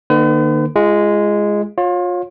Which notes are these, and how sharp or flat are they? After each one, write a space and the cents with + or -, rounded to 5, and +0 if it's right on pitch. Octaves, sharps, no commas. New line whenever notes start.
D#3 -45 A#3 +0 B4 +45
G#3 -5 F4 -35
F4 +30 C#5 -15